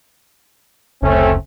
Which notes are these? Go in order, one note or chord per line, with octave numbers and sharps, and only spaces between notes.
F#1 D2 C#3 A3 C4 C#4